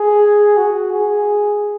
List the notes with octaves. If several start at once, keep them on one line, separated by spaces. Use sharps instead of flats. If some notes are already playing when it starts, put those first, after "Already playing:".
Already playing: G#4
F#4
G#4